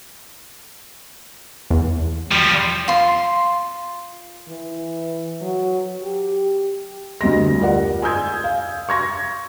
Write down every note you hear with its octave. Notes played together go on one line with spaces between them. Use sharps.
E2
F3 G3
F4 C6
E3
F#3
G4
D2 G2 D#5 A#6
F4 G4 A#4 D5 F#5
G#5 D#6 E6 G6 G#6
F5
C#6 G#6 A#6